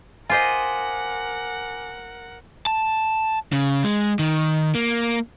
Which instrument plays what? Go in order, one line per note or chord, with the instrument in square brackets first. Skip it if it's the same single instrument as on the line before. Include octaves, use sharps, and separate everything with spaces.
[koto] F4 C5 D#5 [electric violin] A#4 F#5 [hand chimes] G#5 D6 B6
[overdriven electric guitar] A5
C#3
G#3
D#3
A#3